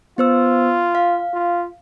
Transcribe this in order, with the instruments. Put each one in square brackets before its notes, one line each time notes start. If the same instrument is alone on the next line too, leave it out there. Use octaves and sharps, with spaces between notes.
[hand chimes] B3 C5 E6 [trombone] F4
[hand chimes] F5
[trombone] F4